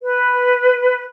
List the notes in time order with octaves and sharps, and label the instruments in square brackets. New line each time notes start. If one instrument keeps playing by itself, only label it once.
[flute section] B4